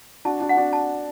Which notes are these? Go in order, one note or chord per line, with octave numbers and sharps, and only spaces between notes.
D4 F#4 A5
D4 F#4
F#5
D4 F#4
A5